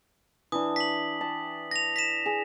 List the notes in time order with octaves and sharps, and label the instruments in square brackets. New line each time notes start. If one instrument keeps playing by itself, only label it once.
[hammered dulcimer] E3 D4 [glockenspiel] D#6
[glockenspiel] B6 F#7
[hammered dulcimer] G5 A5
[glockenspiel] A#6 F7
B6 E7
[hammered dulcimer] G#4